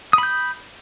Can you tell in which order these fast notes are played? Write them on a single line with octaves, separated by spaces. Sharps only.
D#6 B5 G6